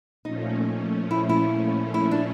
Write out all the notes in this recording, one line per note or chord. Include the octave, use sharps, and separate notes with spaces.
A#2 F3 A3 C#4 D#4
E4
E4
E4
D4